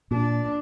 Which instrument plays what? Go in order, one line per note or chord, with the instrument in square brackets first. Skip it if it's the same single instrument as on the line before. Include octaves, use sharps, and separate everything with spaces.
[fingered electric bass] A#2 [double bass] D4